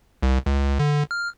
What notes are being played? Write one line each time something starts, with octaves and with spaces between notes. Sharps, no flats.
C2
C#2
D3
F6